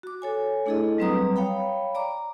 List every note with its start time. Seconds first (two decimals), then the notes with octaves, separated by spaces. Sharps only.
0.03 F#4 D6
0.22 A4 C#5 G#5
0.66 A3 D4 E4 G#4 A4 D#5
0.98 F#3 G3 C4 B4 A#5 D#6
1.36 C#5 F5 G5 B5
1.95 D5 A#5 D6